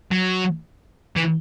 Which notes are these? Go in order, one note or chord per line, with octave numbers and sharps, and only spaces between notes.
F#3
E3